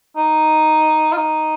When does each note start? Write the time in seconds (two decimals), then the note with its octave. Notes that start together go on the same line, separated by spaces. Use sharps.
0.17 D#4
1.12 F4
1.16 D#4